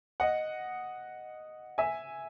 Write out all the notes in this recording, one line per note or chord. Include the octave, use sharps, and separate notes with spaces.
D#5 F#5
E5 G#5